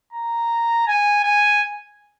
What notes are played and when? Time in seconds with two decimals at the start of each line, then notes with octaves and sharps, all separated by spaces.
0.13 A#5
0.87 G#5
1.24 G#5